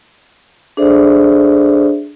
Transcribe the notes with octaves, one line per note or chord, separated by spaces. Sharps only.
D4 G#4 A4 C5 D5 E5